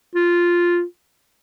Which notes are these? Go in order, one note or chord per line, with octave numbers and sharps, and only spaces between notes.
F4